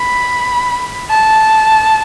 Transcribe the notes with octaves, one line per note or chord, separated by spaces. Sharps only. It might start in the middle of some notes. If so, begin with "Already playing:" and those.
Already playing: B5
A5